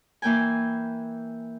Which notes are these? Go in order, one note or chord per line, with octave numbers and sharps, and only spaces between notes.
E3 A#3 G5 G#5